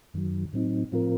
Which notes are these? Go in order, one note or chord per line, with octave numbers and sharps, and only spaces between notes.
F#2 D#3 F#3
A2 F#3 C4 D#4
A2 F3 C4 F4 A#4